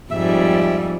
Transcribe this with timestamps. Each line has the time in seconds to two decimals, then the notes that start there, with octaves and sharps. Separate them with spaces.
0.11 F2 G#2 G3 E5